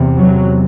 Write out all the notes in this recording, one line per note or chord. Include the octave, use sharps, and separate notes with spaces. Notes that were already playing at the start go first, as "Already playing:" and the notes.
Already playing: E2 C3
F#3